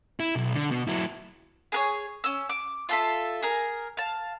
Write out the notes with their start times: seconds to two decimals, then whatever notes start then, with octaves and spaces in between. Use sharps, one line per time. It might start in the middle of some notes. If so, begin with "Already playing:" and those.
0.20 E4
0.36 B1
0.54 D3
0.71 B2
0.88 F#3 E4
1.72 G#4 A#4 C#5
2.24 C#4 E6
2.49 D6
2.89 F4 A4 E5
3.42 G#4 A#4
3.97 F5 A5